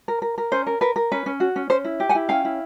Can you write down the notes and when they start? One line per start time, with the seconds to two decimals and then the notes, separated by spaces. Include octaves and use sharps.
0.08 A#4
0.22 A#4
0.38 A#4
0.52 C#4 C5
0.67 A#4
0.81 A#4 B4
0.96 A#4
1.12 C#4 B4
1.26 C#4
1.40 F#4
1.56 C#4
1.70 C#4 C5
1.85 E4
2.00 G4
2.09 F#5 G#5
2.15 E4
2.29 C#4 F5 G5
2.45 E4